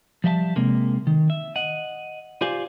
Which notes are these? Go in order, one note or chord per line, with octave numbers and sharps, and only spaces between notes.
F3 G3 E5 G5 A5
C3 G#3 A#3
D#3
E5
D#5 F#5
F4 G4 C5 D5 F5 G#5